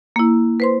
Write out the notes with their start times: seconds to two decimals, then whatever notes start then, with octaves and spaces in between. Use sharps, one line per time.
0.16 A#3 E4
0.60 B4 C5 C6